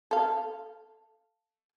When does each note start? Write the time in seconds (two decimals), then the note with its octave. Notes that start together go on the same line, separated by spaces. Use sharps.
0.11 A4 F5